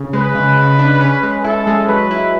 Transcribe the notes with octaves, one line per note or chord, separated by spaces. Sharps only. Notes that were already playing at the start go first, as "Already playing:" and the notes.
Already playing: C#3
G#3 B4
C#3
C#3
D4
C#4
G#3
E4 A4
G#3
F#3 B4
E4